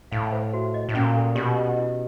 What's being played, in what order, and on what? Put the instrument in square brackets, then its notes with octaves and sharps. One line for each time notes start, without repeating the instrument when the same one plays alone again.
[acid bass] A2 [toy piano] F5
[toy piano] C5
F#4
D#5
[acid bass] A2
[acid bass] A#2 [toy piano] C#4
[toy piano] A4
[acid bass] B2 [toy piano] G4
[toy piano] D#5
E4